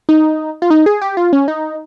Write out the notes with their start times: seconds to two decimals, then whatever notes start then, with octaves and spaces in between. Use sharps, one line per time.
0.09 D#4
0.62 F4
0.70 D#4
0.86 G#4
1.02 G4
1.17 F4
1.33 C#4
1.48 D#4